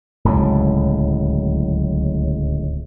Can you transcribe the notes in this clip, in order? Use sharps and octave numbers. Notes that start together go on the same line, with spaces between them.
D1 C#2 A2 F#3